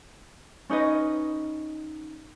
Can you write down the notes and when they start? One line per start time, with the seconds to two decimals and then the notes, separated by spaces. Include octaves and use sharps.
0.70 C#4 D#4 B4 D#5